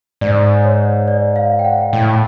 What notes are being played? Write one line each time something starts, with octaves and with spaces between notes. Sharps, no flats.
G#2 D5
C#5
D5
F5
G5
F#5
A2 G5